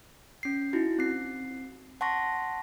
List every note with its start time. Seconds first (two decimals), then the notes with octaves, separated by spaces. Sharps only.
0.43 C#4 C7
0.73 D#4 E4 F#4
0.99 C4 C7
2.01 F#5 A5 C6 C#6 A#6